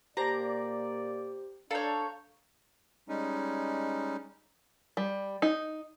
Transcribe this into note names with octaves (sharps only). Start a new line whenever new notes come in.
A#2 A#3 G4 C5 D5 G5 A#5
D4 A4 C#5 F5 A#5 G6
G3 G#3 C#4 D#4
G3
D#4